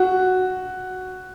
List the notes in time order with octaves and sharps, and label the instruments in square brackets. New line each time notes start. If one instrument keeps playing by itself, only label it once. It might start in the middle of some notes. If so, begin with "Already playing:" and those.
Already playing: [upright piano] F#4